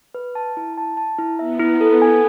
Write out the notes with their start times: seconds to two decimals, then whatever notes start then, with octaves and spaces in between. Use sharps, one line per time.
0.14 B4
0.35 A5
0.57 E4
0.77 A5
0.97 A5
1.18 E4
1.39 B3 E5
1.60 E4
1.81 A4
2.02 G#5